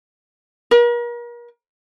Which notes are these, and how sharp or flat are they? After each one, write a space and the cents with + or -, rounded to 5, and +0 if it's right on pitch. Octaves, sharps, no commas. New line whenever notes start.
A#4 +40